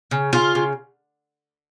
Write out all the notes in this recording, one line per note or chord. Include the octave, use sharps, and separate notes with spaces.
C#3
C#3 F4
C#3